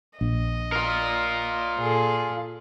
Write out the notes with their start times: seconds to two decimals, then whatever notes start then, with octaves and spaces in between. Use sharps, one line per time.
0.21 A#1 D#5
0.72 F4 A#4
1.79 A#2 G#4 A4